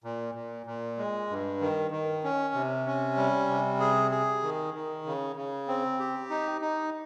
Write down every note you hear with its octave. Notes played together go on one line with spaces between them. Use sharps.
A#2
A#2
A#2
G#3
G2
D#3
D#3
C#4
C3
C#4
G3
C3
G#4
G#4
D#3
D#3
C#3
C#3
C4
G4
D#4
D#4